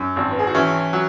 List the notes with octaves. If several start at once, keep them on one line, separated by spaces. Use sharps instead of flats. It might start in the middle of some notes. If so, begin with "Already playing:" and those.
Already playing: F#2 F#3 F#4
G#1
B4
G#4
F#4
E3 C#4 E4
F#3